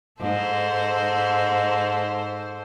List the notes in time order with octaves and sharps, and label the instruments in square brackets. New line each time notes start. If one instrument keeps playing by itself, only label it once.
[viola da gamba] G#2 A4 C5